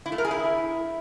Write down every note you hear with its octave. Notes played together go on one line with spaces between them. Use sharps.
E4
A3
A#4
G#4
E4